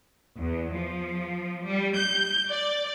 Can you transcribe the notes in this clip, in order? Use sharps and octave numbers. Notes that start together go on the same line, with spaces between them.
E2
F3
G3
G6
D5